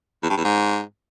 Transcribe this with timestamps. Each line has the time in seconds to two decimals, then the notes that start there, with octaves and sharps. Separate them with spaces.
0.23 E2
0.30 G2
0.37 E2
0.44 G#2